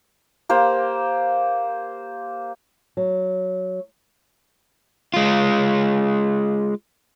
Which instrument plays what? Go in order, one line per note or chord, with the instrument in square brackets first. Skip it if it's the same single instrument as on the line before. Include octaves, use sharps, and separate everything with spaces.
[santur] A#3 G4 C5
[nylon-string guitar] F#3
[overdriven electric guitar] G#3 F4